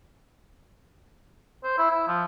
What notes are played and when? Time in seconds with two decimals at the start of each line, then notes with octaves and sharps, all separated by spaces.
1.64 C5
1.78 E4
1.91 E4
2.08 F3